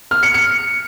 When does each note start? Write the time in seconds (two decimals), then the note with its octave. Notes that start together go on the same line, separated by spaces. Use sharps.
0.11 F6
0.23 C#7
0.34 C#7